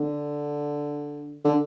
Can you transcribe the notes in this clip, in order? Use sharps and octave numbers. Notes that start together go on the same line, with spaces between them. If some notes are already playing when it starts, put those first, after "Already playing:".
Already playing: D3
D3